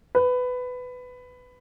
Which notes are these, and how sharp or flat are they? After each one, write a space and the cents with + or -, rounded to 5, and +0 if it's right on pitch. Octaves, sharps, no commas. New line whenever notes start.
B4 +15